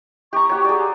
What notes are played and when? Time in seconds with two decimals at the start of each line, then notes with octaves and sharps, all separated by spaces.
0.33 G4 A#5 C#6
0.49 F#4 G4 C#5
0.65 G#4 D5